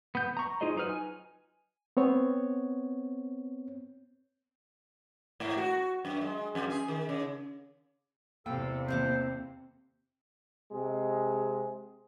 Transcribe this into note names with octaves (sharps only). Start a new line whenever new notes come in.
B3 G6
A#5 C#6
D#4 F4 G#4 C5 D#5
F#3 D#4 B4 F6
G#5
B3 C4 C#5
G#2
F#4
F#2
G#3
F2
G#4
D#3
C#3
E2 C3 A4 F5 G5
D#3 A#3 C4 A4 C5
C3 G#3